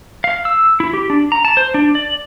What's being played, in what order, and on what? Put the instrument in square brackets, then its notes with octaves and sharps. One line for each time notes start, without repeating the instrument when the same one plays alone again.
[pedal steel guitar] F5
E6
E4
G4
D4
A#5
A5
C5
D4
D5